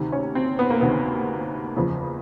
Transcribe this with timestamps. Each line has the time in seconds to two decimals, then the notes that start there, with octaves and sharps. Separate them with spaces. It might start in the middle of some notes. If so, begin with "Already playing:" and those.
Already playing: D2 C3 D#3
0.12 C#4
0.35 C4
0.59 B3
0.70 A#3
0.81 D2 C3 D#3 B3
1.75 F#1 E2 C#3 F3